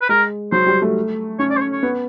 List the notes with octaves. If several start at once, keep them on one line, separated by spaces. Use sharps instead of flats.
B4
G#3 A#4
F#3 C5
G3
A3
C#4 C#5
D5
C5
C#5
C#5
B3